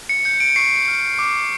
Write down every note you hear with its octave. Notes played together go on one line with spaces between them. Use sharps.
C#7
G6 C#7
D7
C#6 C7
F6
D6